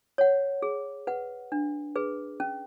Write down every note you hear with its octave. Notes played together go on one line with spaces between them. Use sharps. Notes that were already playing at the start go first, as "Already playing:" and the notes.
C#5 F#5
G#4
B4 F#5
D4
G#4 B4
C#4